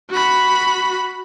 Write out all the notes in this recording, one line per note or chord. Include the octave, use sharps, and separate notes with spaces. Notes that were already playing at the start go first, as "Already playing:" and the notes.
F#4 B5